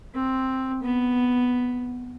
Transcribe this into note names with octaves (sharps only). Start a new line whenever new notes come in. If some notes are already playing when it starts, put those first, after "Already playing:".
C4
B3